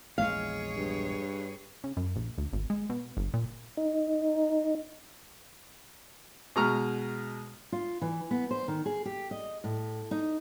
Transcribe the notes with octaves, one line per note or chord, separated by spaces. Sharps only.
A#1 E2 G#3 G#4 C#5 F5
G2
C#3
F#2
A#1
D2
G#1
G#3
B2
G1
A#2
D#4
B2 G#3 A#5 C#6 F6
F4
E3
B3
C5
D#3
G#4
G4
D#5
A2
D#4